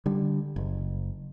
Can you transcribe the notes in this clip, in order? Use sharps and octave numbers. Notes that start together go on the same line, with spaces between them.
D3 G3
F#1